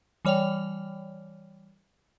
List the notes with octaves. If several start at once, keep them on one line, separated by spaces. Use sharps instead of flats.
E3 G3 C#5 D5 G5 F7